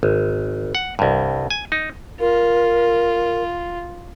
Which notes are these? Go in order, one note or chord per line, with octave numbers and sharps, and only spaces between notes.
G#1
F#5
C2 G2
G#5
D#4
F4 A#4